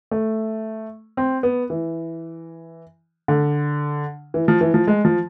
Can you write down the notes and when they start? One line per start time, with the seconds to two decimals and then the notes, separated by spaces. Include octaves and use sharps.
0.11 A3
1.17 C4
1.43 B3
1.70 E3
3.28 D3
4.34 E3
4.48 F3
4.61 E3
4.74 F3
4.87 G#3
5.05 F3